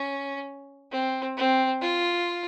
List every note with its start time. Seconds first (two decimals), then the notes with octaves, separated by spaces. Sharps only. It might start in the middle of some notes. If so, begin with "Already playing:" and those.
Already playing: C#4
0.91 C4
1.37 C4
1.81 F4